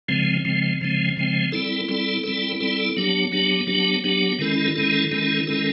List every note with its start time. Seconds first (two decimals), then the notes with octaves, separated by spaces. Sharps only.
0.08 C#3 F3 G#3 C4
0.45 C#3 F3 G#3 C4
0.81 C#3 F3 G#3 C4
1.17 C#3 F3 G#3 C4
1.52 G3 C4 E4 A4
1.88 G3 C4 E4 A4
2.24 G3 C4 E4 A4
2.60 G3 C4 E4 A4
2.97 F#3 B3 D4 G4
3.32 F#3 B3 D4 G4
3.67 F#3 B3 D4 G4
4.04 F#3 B3 D4 G4
4.39 D#3 G#3 C#4 E4 A4
4.75 D#3 G#3 C#4 E4 A4
5.11 D#3 G#3 C#4 E4 A4
5.47 D#3 G#3 C#4 E4 A4